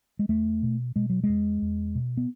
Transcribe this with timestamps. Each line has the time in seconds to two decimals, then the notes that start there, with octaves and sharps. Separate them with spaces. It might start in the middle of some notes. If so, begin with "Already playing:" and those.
0.19 G#3
0.29 E2 A3
0.63 B2
0.96 B2 G#3
1.10 F#3
1.24 E2 G#3
1.62 E2
1.95 B2
2.17 B3